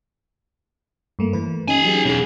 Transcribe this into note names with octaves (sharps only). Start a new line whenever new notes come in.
G2 A3 A#3
E3 B4
C#4 D#4 G4 G#5
F#3 D#4 G#4
E2 B2 C#4 G#4